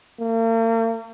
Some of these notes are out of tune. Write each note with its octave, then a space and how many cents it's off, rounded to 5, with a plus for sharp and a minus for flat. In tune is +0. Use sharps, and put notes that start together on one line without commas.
A#3 -45